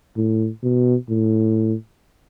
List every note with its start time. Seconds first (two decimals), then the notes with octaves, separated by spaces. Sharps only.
0.17 A2
0.63 B2
1.09 A2